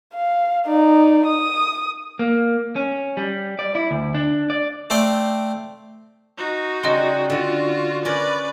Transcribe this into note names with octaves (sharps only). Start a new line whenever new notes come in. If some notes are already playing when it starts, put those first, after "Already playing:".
F5
D#4 D5
D#6
A#3
C#4
G3
D5
E4
D2
D4
D5
A3 C4 D5 F5 G5
D#4 F#4
C#3 G3 D#5 C6
D3 F4 F#4 F#5
C#4 A#4 B4 D5